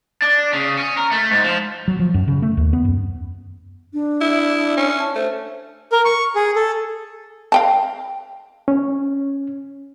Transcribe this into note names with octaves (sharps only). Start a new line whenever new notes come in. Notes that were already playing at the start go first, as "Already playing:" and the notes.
D4
C#3
C#4
A#4
A3
G#2
F3
F#3
F3
F#2
C#3
A3
D#2
B3
F#2
D4
E4
C#4
A5
A3 C5
A#4
C#6
G#4
A4
F5 G5 A5
C#4